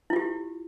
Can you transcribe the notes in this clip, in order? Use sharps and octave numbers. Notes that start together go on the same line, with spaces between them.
E4 F4 G4